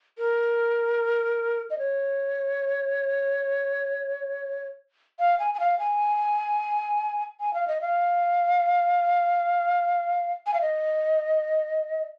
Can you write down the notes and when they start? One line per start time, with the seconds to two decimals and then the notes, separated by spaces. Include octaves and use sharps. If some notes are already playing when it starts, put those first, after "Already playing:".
0.18 A#4
1.70 D#5
1.79 C#5
5.20 F5
5.39 G#5
5.54 G#5
5.60 F5
5.79 G#5
7.40 G#5
7.54 F5
7.68 D#5
7.81 F5
10.47 G#5
10.54 F5
10.61 D#5